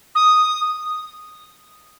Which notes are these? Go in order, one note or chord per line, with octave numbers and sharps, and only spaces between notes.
D#6